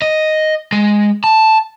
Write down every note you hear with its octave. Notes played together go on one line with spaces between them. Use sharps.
D#5
G#3
A5